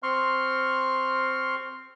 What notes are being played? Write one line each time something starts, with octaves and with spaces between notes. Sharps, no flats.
C4 C6 C#6 F6